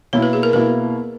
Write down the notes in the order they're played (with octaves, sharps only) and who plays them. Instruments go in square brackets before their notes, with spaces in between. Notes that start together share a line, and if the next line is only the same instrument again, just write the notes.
[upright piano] B2 A#3 E4 [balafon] C#5
[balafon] B4
G#4
A#4
[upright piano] B2 A#3 E4 [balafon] B4